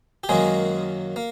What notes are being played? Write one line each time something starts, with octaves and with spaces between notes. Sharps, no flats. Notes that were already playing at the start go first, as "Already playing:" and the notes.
G4
F#2 D#3 F#3 G#3 A#3 G#4
A#3